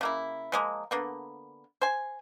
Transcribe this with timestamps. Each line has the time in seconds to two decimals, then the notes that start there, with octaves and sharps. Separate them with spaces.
0.01 C#3 A#3 E4
0.52 F3 G#3 A#3
0.91 D3 A#3 B3
1.82 C5 G#5